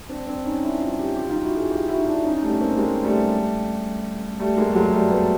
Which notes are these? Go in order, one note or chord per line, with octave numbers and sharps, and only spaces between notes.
C4 D4
C4 D4
C#4 D#4
D4 E4
D#4 F4
F4 G4
F4 G4
D#4 F4
E4 F#4
F#4 G#4
F4 G4
E4 F#4
D#4
D4 E4
C#4 D#4
G3 A3
C#4
A#3 C4
G#3 A#3
G3 A3
G3 A3
G#3 A#3
A3
F#3 G#3
G3 A3
A3 B3